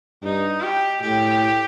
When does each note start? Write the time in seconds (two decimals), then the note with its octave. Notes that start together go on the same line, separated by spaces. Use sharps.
0.23 G2 D#4
0.62 G4
1.01 A2 G4